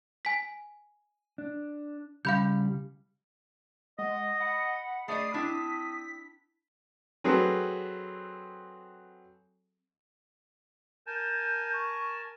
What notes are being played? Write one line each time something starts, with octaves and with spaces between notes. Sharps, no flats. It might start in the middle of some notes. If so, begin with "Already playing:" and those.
G#5 B6
D4
C#3 G3 F5 B5 G6
G#3 D#5 F#5
F#5 B5
A3 G#4 D5 D#5 C7
C4 D4 E4 D#6 B6
F#3 C4 G#4 A4 B4
A#4 G#5 A5 G6
C#6